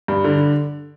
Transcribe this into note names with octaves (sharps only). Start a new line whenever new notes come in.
G2
D3